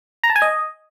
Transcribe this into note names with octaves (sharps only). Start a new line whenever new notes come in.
A#5
A5
G#5
D#5